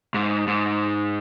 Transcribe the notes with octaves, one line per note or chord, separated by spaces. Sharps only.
G#2
G#2